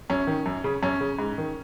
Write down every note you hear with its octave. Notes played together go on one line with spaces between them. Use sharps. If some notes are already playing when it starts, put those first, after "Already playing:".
F#2 C#4
D#3
F#2
C#3
F#2 C#4
C#3
G#2
D#3